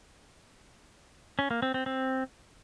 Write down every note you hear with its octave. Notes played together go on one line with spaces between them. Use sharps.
C#4
A#3
C4
C4
C4